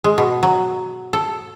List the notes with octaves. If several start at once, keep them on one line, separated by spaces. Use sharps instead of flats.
G#3
B2
F#3
A4